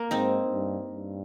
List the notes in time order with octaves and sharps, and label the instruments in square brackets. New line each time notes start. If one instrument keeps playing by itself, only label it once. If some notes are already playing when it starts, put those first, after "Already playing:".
Already playing: [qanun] A#3
[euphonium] G#2 [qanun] C4 D#4
[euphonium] G2
G2